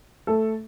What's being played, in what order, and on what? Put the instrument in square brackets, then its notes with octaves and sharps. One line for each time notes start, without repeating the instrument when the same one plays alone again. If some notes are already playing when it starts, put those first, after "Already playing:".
[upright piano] A3 A4